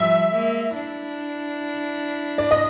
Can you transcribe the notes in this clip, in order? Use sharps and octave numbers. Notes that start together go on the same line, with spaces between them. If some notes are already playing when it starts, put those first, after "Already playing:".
Already playing: F3 G3 E5
G#3 A#3
D4 E4
D5
D#5